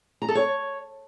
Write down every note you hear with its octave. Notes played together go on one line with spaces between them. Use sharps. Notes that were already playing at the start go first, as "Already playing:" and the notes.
A#5
A4
C#5